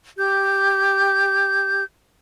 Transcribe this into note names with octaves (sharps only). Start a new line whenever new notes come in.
G4 G6